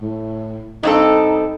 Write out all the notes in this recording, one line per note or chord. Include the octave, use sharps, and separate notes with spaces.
A2
G2 C4 D#4 A4